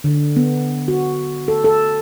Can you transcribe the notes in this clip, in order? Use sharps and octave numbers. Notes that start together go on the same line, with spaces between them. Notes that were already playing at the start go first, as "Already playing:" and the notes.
D3
B3
F#4
A4
A4